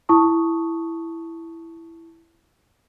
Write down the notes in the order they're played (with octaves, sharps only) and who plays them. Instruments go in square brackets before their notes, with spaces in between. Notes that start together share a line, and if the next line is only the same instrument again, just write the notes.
[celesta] E4 A5 C#6 D#6